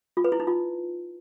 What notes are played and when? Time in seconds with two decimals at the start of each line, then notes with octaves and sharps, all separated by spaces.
0.17 F4
0.24 B4
0.32 E4
0.40 D#4
0.47 F4